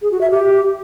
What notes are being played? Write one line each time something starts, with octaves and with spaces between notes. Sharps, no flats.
G#4
F#4
E5
G4